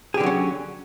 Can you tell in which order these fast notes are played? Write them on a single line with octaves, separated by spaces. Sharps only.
G#4 G4 D3 F#3 C#4